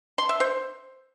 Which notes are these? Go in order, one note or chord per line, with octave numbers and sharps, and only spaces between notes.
C6
E5
C5